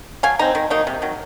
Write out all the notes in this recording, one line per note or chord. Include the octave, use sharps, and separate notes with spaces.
F#3 F5 G#5
C4 D#4 A#5
D#3
F#3 A#3 D#4
C3
D#3 F#3